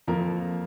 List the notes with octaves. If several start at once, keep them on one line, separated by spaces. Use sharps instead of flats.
F2 F3 A#3 A#4